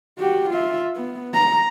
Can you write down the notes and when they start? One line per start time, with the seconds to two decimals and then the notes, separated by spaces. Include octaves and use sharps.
0.19 F#4 G4
0.50 F4 E5
0.96 B3
1.34 A#5